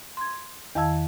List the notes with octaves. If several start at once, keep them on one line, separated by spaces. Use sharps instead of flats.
C6 G#6
E2 D#3 F5 A5 E6 G#6